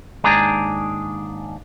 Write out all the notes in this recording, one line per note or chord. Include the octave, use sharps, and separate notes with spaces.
D#2 G#2 D4 G#4 A#5